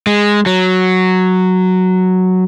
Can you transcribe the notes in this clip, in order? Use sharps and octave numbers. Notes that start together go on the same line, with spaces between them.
G#3
F#3